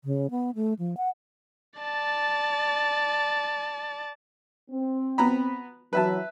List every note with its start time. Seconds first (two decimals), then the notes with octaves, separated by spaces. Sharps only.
0.04 C#3
0.31 B3
0.55 A3
0.79 F3
0.97 F#5
1.80 D5 A5
4.70 C4
5.18 B3 A#5 B5
5.93 E3 F#3 B4 E5 A5